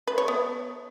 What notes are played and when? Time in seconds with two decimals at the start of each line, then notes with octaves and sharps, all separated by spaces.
0.07 B4
0.18 C#5
0.28 B3